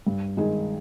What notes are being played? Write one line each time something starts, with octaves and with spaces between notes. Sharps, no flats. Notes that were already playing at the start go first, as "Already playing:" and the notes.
G2
D#3 G#3 D#4 G#4